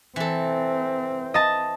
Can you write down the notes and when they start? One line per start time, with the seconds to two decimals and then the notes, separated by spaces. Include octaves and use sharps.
0.16 E3 C4 A4
1.34 D#5 A5